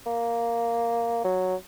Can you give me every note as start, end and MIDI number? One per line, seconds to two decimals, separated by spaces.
0.07 1.22 58
1.25 1.55 54